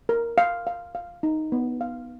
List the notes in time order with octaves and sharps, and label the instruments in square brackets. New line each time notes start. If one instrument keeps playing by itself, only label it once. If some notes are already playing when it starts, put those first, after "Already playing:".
[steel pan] A#4
F5
F5
F5
D#4
B3
F5